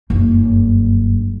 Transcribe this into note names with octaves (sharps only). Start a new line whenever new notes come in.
F#1 G2